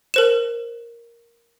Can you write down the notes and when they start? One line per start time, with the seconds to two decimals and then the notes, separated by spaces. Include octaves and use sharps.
0.14 A#4 C5 E7